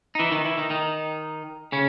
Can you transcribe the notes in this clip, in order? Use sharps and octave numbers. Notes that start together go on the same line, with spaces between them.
D#4
E3 E4
D#3 D#4
E3 E4
D#3 D#4
D#3 D#4
C#3 C#4